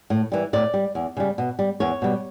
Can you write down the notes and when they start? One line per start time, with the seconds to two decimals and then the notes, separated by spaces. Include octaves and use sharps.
0.10 A2
0.32 E3 G3
0.53 A2 D5
0.74 G3
0.95 E2
1.17 C#3 G3
1.38 B2
1.59 G3
1.80 E2 C#5
2.02 B2 G3